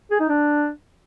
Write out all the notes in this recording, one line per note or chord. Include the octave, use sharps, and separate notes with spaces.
G#4
D#4
D4